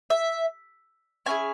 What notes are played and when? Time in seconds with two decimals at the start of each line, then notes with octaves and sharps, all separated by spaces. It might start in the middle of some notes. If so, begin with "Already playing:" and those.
0.10 E5
1.26 A3 C#4 E4 G#4 G#5